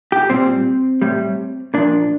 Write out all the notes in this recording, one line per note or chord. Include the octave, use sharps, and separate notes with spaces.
G4
A#2 G3 C4
A2 G3
A#2 F3 D4